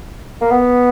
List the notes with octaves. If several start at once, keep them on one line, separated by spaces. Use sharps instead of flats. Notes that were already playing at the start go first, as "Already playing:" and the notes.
A#3
B3